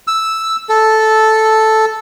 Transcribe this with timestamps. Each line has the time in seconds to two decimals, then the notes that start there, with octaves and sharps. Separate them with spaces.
0.07 E6
0.69 A4